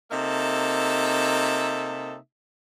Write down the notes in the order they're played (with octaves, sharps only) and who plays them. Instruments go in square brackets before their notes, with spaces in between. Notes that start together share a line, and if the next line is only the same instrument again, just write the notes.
[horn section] C3 A#3 D#4 A4 E5